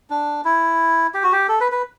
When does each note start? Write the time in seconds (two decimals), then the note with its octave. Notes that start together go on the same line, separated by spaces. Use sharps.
0.10 D4
0.45 E4
1.14 G4
1.23 F#4
1.32 G4
1.48 A4
1.60 B4
1.72 B4